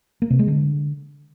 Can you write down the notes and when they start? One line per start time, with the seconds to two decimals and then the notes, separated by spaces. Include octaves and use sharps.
0.22 A#3
0.30 C3
0.39 G#3
0.48 D3